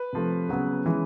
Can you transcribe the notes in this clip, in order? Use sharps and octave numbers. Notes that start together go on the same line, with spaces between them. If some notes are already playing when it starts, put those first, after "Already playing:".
Already playing: B4
C3 F3 A3
C#3 F#3 B3
C#3 E3 G#3